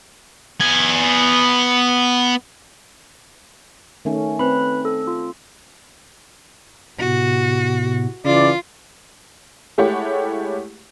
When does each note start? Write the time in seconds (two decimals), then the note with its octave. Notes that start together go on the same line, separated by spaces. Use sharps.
0.60 B3 G#5
4.05 D#3 A3 C#4
4.39 C4 B4 B5
4.85 A4
5.07 F4
6.99 A2 C3 B3 F#4
8.25 C#3 E3 F4 D5
9.78 G#3 A3 E4 G4 C#5 F#5